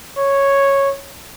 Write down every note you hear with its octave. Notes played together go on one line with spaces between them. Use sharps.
C#5